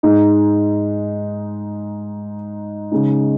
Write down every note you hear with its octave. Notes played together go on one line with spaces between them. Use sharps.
G#2 G#3 D#4
C#3 G#3 D#4